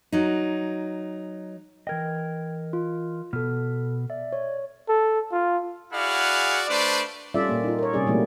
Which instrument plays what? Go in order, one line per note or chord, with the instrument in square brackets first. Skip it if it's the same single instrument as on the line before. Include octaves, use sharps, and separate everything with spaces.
[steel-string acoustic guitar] F#3 D#4
[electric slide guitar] E3 A#4 D#5 [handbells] G5 G#6
[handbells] F4
[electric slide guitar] B2 B3 [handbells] A4 F6
[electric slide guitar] D5 [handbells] E5
[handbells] C#5
[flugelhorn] A4
F4
[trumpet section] E4 F#4 G#4 D5 F5 F#5
A3 D4 B4 C5 D5
[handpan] G3 C#4 F4 A4 D5 E5
A#2 A#3
D#4 F4
A#4 C#5
C3 G3 C#4 G#4 D5
A#2 E3 F#3 G3 A3 A#3